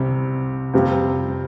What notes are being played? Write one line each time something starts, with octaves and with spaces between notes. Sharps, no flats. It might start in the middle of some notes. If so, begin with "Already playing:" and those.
Already playing: C2 C3 G3
F2 C3 G3